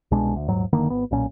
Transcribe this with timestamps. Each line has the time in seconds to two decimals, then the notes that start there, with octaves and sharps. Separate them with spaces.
0.11 C2 B2 G#3 D4
0.36 D2
0.48 D#1 G#2 F#3
0.73 F#1 D3 D#3 A#3
0.90 G#1 B3
1.11 B1 A#2 C#4